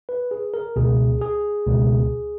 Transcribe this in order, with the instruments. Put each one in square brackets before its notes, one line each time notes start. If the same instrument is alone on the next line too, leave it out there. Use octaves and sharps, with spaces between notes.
[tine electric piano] B4
G#4
A#4
C#2 B2 G#4
G#4
C#2 B2